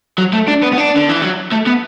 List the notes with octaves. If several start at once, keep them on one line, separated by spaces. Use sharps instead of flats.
F#3
A3
D4
B3
B3
D4
D3
E3
F#3
A3
B3